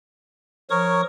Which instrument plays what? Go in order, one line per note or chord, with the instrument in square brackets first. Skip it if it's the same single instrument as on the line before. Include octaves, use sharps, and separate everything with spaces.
[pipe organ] F3 C#6 D#6 [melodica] A#4 C#5